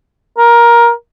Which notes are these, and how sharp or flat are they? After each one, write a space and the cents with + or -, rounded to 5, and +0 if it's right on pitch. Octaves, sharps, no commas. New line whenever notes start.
A#4 +15